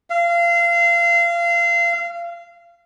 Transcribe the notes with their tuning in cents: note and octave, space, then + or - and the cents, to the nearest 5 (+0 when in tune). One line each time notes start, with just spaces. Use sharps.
F5 -25